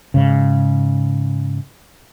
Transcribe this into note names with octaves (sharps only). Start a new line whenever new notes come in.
G#2 C#3